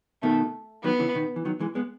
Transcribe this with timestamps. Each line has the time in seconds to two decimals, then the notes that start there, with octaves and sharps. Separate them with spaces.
0.22 B2 D#3 A3
0.84 D#3 F#3 B3
0.99 C#3 E3
1.15 B2 D#3
1.36 E3
1.45 D#3 F#3
1.60 E3 G#3
1.75 G#3 B3